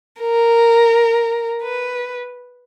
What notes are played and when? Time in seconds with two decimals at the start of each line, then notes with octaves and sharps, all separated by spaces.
0.21 A#4
1.62 B4